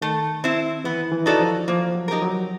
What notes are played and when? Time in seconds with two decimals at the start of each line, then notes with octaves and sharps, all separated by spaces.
0.02 D#3 A3
0.44 C4 E4
0.84 E3 B3
1.12 E3
1.26 D#4 F#4 A4 D5
1.40 F3
1.68 F3 A#3
1.95 F#3
2.08 D#4 G4 A#4
2.22 F#3